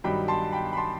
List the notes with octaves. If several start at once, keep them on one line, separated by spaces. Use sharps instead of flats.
G2 D#3 F#3 G5 B5
A5 C6
G5 B5
B5
A5 C6